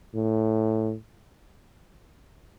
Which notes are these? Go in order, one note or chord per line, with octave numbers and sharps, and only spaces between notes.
A2